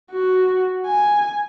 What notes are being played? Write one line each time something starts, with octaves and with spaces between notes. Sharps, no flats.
F#4
G#5